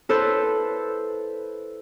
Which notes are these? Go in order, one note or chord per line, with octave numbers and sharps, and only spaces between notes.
E4 A4 B4 C5